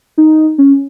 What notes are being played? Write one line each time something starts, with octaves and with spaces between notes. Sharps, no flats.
D#4
C#4